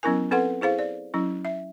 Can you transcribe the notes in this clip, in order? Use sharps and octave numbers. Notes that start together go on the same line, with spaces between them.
F#3 B3 C#4 E4 A#4 G#5
C4 A4 B4 F#5 C6
E4 G#4 C5 F5
D5
F#3 C#4 E4
E5